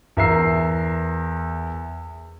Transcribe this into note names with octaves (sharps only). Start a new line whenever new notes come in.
E2 A#4 E5 A#5 E6 C7